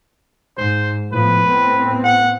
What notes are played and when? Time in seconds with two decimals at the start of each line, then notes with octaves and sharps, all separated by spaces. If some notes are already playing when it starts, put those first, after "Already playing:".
0.57 G#2 C5
1.13 A2 F3 B3 B4
1.46 A2 B3 C4
2.04 F#5